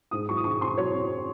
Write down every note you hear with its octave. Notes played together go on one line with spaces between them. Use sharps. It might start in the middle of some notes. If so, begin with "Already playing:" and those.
G#2 D#6
F#3 C#6
D#6
G#2 C#6
C4 C6
F#3 C#5
C4